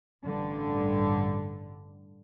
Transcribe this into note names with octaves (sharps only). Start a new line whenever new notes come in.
A1 G2 D3